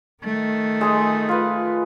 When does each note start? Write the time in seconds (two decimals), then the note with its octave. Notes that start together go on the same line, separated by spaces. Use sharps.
0.24 D#3 A3
0.81 G#3 G#4 D#5
1.29 F4 B4